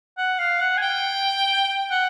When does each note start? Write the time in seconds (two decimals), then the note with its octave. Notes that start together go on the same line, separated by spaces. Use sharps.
0.17 F#5
0.38 F5
0.60 F#5
0.77 G#5
0.82 G5
1.90 F#5